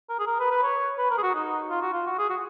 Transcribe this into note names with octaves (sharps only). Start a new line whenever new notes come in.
A#4
G#4
A#4
B4
B4
C#5
B4
A#4
G#4
F#4
D#4
F4
F#4
F4
F#4
G#4
F#4